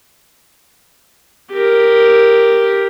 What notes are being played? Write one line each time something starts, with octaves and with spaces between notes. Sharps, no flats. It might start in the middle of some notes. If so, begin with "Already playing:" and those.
G4 A#4